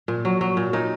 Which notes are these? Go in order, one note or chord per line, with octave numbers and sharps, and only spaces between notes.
A#2
F#3
F#3
A#2
A#2 D#4